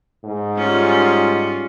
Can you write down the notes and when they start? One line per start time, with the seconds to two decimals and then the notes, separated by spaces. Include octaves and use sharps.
0.25 G#2
0.57 G3 C#4 F4